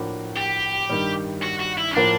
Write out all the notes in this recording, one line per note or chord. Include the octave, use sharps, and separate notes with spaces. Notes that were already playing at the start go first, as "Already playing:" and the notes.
Already playing: A2 F3 A#3 D4 F#4
G4
G2 D#3 G3
F#4
F#4
E4
C#4
A2 F3 A#3 D4